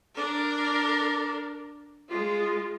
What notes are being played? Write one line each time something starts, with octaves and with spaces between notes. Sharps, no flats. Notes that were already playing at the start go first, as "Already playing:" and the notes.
D4 A#4
G#3 F4